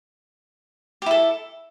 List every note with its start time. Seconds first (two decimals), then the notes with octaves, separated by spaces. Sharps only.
1.02 G4
1.06 E4
1.11 A4